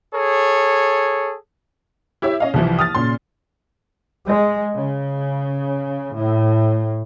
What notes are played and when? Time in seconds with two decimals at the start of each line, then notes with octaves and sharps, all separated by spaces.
0.13 G#4 A4 C#5
2.22 E4 G4 C#5 E5
2.40 C#4 D#5 F5
2.54 C2 E3 F3
2.79 D#6 F6 A6
2.95 A#2 C#3 C6
4.26 G#3
4.75 C#3
6.15 A2